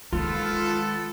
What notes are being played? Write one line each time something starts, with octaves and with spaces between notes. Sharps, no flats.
D#3 G#3 B3 F4 A4